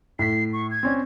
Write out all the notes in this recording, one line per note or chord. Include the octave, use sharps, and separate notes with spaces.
A2 B6 C7
C#6
G#6
C4 C#4 D5